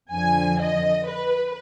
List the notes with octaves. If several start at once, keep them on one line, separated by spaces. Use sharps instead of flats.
F2 D3 F3 G#5
D#5
B4